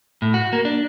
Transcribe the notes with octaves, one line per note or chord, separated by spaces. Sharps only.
A2
F#4
A#3
D4